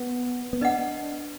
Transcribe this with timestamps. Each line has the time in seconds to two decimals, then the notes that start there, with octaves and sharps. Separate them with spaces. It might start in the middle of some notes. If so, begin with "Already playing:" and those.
Already playing: B3
0.53 B3
0.61 D4 B4 D#5 F#5